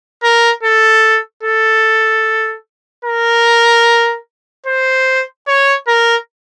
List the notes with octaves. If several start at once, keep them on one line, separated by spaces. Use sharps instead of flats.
A#4
A4
A4
A#4
C5
C#5
A#4